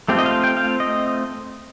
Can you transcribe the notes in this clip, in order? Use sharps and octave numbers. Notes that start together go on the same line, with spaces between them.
A3 C4 F4 G4
D#5
F5
G5
F5
D#5